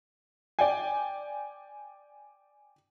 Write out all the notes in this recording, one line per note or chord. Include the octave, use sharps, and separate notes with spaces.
D5 G5 G#5